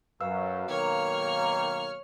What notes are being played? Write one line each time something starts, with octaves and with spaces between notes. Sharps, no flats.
F#2 B4 F5 E6
B1 D#3 A#3 C#5 F6